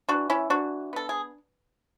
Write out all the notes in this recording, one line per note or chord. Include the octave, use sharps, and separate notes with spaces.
E3 D4 F#4
C#4 E4
E3 D4 F#4
B3 A4
G#4